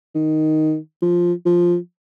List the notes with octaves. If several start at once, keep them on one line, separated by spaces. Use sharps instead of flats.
D#3
F3
F3